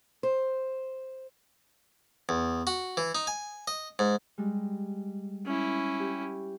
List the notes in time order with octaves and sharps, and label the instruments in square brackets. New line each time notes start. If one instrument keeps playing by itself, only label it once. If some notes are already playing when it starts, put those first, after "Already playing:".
[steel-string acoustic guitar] C5
[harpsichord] E2
F#4
E3
D#4
G#5
D#5
G#2
[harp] G3 G#3
[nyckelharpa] C#4 E4
[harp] G4